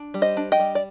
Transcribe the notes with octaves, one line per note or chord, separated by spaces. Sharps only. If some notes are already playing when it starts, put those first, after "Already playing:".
Already playing: D4
G3
C5 D#5
D4
D#5 G5
G3
D5